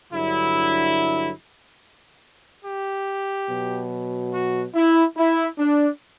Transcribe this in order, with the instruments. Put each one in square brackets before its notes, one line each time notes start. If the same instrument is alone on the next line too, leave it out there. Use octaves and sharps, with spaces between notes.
[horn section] G2 D3 F#3 E4
G4
B2 F#3
F#4
E4
E4
D4